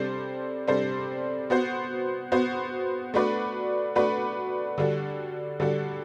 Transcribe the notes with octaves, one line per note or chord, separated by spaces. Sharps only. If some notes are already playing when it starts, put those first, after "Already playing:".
Already playing: C3 G3 D4 A4 C5
C3 G3 D4 A4 C5
B3 F#4 C5
B3 F#4 C5
A3 D4 F#4 B4 D5
A3 D4 F#4 B4 D5
D3 G3 D4 F#4 A4
D3 G3 D4 F#4 A4